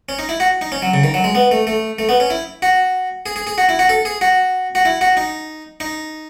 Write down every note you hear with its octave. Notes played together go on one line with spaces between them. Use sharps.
C#4
D#4
E4
F#4
D#4
C#4
F#3
C#3
D#3
F#3
G#3
B3
A3
A3
A3
B3
C#4
E4
F#4
G#4
G#4
G#4
F#4
E4
F#4
A4
G#4
F#4
F#4
E4
F#4
D#4
D#4